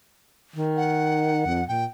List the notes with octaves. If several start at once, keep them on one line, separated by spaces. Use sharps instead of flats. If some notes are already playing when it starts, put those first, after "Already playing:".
D#3
F#5
F2
A#2 G5